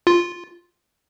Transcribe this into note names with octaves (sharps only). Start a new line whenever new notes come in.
F4